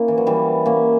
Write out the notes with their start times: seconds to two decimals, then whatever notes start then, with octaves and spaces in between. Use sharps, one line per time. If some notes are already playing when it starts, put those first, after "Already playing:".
Already playing: A#3 C#4 E4
0.08 E3
0.18 F#3
0.27 E3 G3
0.66 A#3 C#4